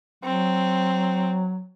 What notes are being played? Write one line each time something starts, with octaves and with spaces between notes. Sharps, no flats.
F#3 C4